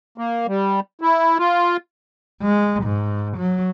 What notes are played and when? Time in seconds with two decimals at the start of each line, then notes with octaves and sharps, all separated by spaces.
0.18 A#3
0.47 G3
1.01 E4
1.38 F4
2.42 G#3
2.83 G#2
3.37 F#3